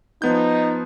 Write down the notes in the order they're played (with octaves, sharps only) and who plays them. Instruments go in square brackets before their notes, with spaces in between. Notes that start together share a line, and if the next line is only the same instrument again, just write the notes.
[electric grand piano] F3 B3 G6 [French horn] D#4